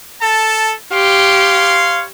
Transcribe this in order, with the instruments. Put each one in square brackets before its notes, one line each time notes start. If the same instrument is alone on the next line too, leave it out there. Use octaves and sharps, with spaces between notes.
[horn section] A4 A5
[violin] G4 [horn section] C#5 F5 C6